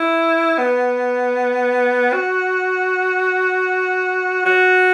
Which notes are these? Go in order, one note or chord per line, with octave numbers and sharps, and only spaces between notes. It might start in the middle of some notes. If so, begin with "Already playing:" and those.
Already playing: E4
B3
F#4
F#4